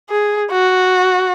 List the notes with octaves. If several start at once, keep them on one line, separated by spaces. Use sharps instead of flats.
G#4
F#4